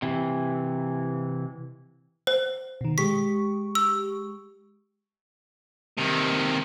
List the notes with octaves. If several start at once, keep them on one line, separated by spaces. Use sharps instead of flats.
C3 E3
C5
B2 D#3
G#3 G4 C#6 B6
E6
C3 D#3